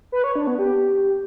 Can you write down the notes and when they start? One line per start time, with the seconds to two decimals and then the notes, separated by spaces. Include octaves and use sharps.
0.12 B4
0.24 C#5
0.36 D4
0.47 B3
0.59 G4